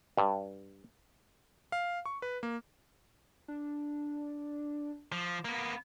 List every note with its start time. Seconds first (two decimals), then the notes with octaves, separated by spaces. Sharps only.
0.17 G2
1.72 F5
2.06 C#6
2.22 B4
2.43 A#3
3.48 D4
5.12 F3 D6
5.45 A#3 B3